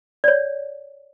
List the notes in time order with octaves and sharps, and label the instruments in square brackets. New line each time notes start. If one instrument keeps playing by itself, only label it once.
[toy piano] C#5 D5